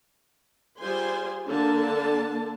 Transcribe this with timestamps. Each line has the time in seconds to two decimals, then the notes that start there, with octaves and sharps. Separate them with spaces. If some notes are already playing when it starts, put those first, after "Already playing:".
0.79 G3 F4 G#4 C5 G#5 C6
1.45 D3 A#3 A5